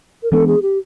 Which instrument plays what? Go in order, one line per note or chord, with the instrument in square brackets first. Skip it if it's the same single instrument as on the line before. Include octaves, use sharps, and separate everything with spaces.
[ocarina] A#4
[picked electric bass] E3 G#3 B3 D4 [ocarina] A4
[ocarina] G#4
G4